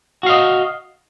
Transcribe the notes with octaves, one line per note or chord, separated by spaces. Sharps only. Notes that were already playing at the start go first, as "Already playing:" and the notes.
F#4 D#5 F5